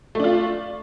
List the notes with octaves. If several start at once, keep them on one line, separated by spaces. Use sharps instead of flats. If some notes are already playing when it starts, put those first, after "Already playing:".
A3 D4 F4